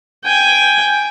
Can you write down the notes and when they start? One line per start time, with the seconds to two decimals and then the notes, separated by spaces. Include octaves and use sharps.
0.24 G5 G#5